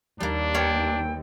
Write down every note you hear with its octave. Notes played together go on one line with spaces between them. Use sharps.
D#2 G3 A#3 D4
B3 C#5 F5 G5